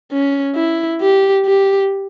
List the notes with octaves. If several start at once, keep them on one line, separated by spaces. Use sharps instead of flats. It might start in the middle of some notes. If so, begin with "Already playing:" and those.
C#4
E4
G4
G4